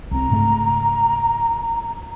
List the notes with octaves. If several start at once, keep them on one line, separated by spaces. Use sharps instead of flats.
C2 C4 A#5
G#2 C#3 A3